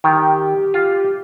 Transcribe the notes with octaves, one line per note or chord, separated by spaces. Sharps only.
D#3 G4
F4